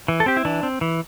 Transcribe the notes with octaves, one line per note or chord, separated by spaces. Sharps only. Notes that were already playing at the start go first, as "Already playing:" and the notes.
E3
A4
C4 G4
E4
E3 D4
C4
E3